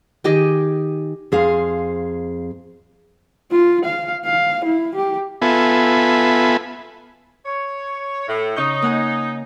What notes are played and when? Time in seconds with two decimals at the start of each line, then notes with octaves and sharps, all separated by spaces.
0.24 D#3 G4 G#4 D#5
1.32 F2 G#4 C5 F5
3.51 F4
3.85 F5
4.25 F5
4.65 E4
4.95 G4
5.42 B3 F4 A4 E5 G#5 B5
7.45 C#5
8.28 A2
8.56 C#3 D#4 C#6 G6
8.82 A#3 F#5 G#5